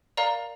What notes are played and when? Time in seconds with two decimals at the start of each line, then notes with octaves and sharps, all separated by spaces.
0.17 A#4 D5 F5 A#5